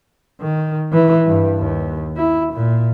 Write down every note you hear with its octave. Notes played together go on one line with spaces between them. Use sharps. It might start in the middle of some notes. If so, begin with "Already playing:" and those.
D#3
E3
G2
D#2
E4
A#2